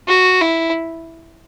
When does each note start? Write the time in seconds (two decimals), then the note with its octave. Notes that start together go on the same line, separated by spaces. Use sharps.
0.08 F#4
0.41 E4